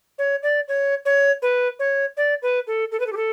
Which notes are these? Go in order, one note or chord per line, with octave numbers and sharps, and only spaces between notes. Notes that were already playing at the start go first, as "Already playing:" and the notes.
C#5
D5
C#5
C#5
B4
C#5
D5
B4
A4
A4
B4
A4
G4
A4